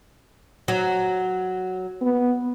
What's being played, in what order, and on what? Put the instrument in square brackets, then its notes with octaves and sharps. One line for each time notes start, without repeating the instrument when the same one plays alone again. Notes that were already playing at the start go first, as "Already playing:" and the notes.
[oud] F#3
[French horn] B3